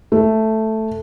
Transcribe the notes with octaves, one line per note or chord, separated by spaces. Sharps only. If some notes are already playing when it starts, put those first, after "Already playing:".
A3